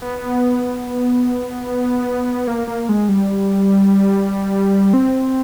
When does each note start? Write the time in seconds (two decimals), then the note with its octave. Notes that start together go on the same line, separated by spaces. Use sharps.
0.02 B3
2.47 A#3
2.67 A#3
2.89 G#3
3.09 G3
4.94 C4